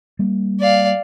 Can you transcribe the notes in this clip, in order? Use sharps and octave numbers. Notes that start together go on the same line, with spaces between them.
G3 A#3
D5 F5